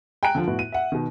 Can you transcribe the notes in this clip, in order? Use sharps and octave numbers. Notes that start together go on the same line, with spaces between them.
G5 G#5 A#5 F#6 D7
D3 F3
A2 B3 F#4
D#7
E5 F#5
B2 D#3